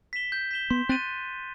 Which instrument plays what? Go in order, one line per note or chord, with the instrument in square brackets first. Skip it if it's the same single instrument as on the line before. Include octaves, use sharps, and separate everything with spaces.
[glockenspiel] B6 E7 G7
G6
B6 E7 G7
[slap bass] B3 [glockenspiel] C6
[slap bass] C4 [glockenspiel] F#6 A6 D#7